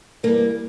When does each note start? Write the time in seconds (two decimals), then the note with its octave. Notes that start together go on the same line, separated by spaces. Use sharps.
0.23 G2 E3 G3 A#3 A#4